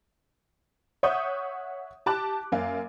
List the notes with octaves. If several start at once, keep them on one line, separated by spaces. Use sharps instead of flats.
C#5 E5 F#5 C#6 D#6 G6
G4 A5 D6 F#6
F#2 A#3 F5